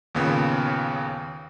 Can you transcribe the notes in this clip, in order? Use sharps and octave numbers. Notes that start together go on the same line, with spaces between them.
D#2 A#2 C#3 B3